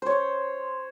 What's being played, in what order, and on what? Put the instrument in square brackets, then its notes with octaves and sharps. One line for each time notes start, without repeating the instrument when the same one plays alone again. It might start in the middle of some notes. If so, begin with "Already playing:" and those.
[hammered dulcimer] C5 C#5